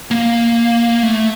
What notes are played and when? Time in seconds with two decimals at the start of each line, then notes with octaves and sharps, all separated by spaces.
0.11 A#3
1.03 A3